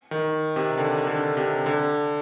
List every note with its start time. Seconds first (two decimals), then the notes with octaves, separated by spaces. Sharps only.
0.11 D#3
0.56 C3
0.78 D3
1.07 D3
1.37 C3
1.66 D3